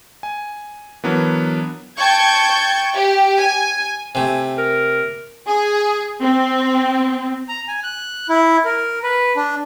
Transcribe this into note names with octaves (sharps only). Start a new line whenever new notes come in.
G#5
E3 F#3 B3 D4 A#4
G5 A5 C#6 G6 G#6
G4
G#5
C3 A3 G#5
A#4
G#4
C4
A#5
G#5
F#6
E4
A#4
B4
D4